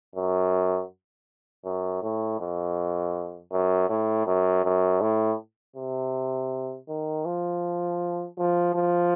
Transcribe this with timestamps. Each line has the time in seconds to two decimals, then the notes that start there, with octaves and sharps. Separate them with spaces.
0.15 F#2
1.65 F#2
2.02 A2
2.40 F2
3.52 F#2
3.89 A2
4.27 F#2
4.64 F#2
5.01 A2
5.76 C3
6.88 D#3
7.26 F3
8.38 F3
8.75 F3